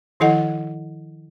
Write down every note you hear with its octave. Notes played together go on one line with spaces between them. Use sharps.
D#3 F3 E4 A4 D#5 F#5